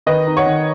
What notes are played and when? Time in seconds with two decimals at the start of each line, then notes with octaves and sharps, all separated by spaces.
0.06 D#3 B4 D#5
0.27 D#4
0.37 C#5 F#5
0.46 D#3